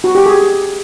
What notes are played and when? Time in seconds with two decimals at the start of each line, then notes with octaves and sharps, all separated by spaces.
0.04 F#4
0.15 G4
0.26 G#4